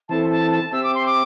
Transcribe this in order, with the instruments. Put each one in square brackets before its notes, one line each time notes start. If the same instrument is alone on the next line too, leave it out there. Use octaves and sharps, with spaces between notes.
[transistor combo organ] E3 C4 E4 A4 [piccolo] A5
[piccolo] A5
A5
[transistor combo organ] C4 G4 E5 [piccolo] E6
[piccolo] D6
C6
D6